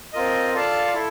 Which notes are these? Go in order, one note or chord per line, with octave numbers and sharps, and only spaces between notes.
C4 F4 A#4 D#5
F4 A4 D5 F5 A5
E4 A4